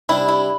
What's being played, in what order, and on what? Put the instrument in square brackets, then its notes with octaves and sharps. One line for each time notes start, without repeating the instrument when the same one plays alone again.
[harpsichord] C3 G3 D4 [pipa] E4
[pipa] E4